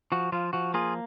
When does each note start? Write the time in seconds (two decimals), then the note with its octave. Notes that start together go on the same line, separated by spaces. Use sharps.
0.12 F3 F#4
0.32 F3 F4
0.53 F3 F#4
0.74 A#3 F4 G#4